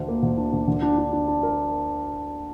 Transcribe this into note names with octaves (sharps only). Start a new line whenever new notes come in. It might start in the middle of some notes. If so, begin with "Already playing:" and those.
Already playing: D2 D4
A#3
D2
D4
D2
D3
D4
D4
D4
D4
A#4